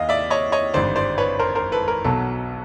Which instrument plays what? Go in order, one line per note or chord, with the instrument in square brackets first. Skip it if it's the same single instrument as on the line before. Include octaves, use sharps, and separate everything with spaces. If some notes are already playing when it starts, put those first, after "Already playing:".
Already playing: [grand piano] D#2 D#3 D#5 F5
D5 E5
C#5 D#5
C#5 D#5
G#1 G2 D3 C5 D5
C5 D5
B4 C#5
A#4 C5
A#4 C5
A4 B4
A#4
B1 B2 F#3 A4